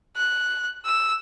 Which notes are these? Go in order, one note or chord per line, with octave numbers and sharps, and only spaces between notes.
F#6
E6